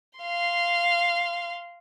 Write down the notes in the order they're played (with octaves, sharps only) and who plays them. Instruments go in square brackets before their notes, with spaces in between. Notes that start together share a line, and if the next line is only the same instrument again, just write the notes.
[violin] F5 C6